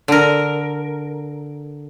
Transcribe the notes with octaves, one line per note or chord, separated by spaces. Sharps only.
D3 A#4